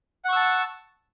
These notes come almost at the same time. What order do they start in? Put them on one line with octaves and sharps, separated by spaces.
F#5 C#6 E6 A5